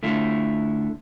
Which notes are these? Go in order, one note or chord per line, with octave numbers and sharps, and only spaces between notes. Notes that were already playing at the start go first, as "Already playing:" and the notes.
D3 A3 E4 F4